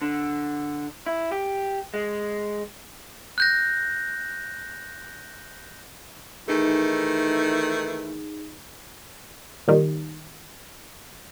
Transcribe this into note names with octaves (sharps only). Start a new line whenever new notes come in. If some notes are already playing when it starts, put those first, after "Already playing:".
D3
E4
G4
G#3
F#6 G6 A#6
D#3 E3 A3 D#4 G#4
A#2 D#3 G3